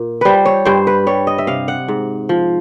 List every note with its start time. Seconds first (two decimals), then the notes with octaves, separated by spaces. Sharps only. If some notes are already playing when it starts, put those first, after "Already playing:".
Already playing: A#2
0.21 G3 B4 C5
0.45 C#5
0.65 G2 C5
0.87 B4
1.07 G3 C#5
1.27 D#5
1.38 E5
1.47 C3 F5
1.68 F#5
1.88 G#2
2.29 F3